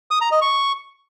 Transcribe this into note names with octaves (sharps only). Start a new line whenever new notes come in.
D#6
A#5
D#5
C#6